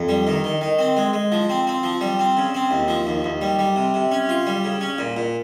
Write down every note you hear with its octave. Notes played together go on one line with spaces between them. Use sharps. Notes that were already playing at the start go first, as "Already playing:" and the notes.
Already playing: F2
G3
D#3
D#3
D#3
C4
G#3
G#3
F3
C4
C4
F3
G3
C4
C#3
C4
D#2
F3
D#2
D#2
G3
G3
C3
C3
C#4
F4
G3
C#3
C#4
A#2
A#2